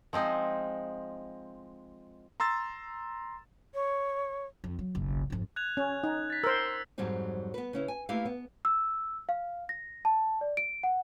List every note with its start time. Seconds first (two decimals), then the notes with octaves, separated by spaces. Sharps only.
0.13 F3 G#3 C4 D#4
2.40 A#5 C6 E6 A6
3.74 C#5
4.64 F2
4.79 F#3
4.95 F#1 B1
5.30 G#1 F2
5.56 F#6 G#6 F7
5.77 C#4
6.04 D#4
6.30 A6 B6
6.44 A#4 C5 E6
6.98 F2 G#2 F#3 G3 C4 D#4
7.54 B3 B4
7.73 C#3 C#4 E4
7.88 G#5
8.09 A3 A#3 E4 G4 B4 F5
8.25 B3
8.65 E6
9.29 F5
9.69 A#6
10.05 A5
10.41 D5
10.57 D7
10.83 F#5